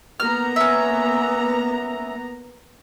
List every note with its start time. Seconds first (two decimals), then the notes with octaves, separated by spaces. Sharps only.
0.20 A#3 B3 A#5 F6
0.56 C#4 E5